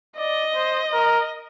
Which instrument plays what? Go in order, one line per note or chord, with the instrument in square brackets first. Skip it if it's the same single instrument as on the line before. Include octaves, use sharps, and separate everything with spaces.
[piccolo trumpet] D5 [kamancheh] D#5
[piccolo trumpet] C5
A#4